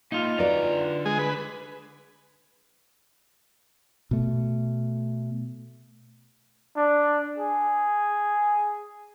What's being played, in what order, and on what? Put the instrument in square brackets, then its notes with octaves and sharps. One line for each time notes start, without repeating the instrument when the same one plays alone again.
[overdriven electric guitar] A2 A#3 [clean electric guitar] D#4 F4
[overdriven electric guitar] D3 A#5 [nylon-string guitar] F#4 B4 D5
[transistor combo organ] G#3 G#4
B4
[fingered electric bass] B2 A3
[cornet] D4
G#4